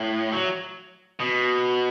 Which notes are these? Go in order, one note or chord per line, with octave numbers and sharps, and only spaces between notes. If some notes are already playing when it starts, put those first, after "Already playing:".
Already playing: A2
F#3
B2